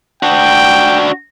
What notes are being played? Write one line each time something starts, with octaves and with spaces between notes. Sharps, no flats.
D4 F#4 G5